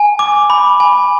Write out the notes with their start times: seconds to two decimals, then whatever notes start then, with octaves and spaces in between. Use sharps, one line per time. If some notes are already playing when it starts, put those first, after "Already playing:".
Already playing: G#5
0.19 D6
0.50 B5
0.80 G#5